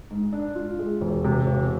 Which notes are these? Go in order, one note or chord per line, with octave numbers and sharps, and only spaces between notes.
G#2
D4
F4
G#3
E1
C3
E1